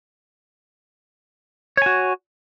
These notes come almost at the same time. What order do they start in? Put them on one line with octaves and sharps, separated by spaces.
C#5 G#5 F#4